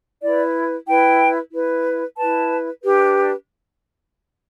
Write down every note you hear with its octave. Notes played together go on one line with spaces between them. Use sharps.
E4 B4 D5
E4 B4 G5
E4 B4
E4 B4 A5
D4 G4 B4